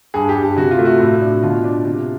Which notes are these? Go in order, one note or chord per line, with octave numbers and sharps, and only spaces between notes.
G2 G#4
G4
G2
G4
C3 F#4
F4
A3
F#4
A2
D4
B2 F4
D4
C3